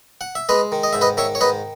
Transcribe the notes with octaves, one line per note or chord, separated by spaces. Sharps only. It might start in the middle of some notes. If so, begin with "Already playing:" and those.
F#5
E5
G#3 B4 D#5
D#3
D#5
G#2 E5
B4 D#5
D#3 C#5 E5
C#5
G#2 B4 D#5